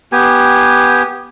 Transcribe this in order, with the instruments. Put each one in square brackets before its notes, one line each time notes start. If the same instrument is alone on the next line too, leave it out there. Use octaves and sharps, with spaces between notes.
[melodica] B3 G4 G#5